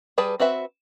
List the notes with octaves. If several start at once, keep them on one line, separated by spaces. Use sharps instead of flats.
G3 G#4 B4 A5
C4 F#4 B4 E5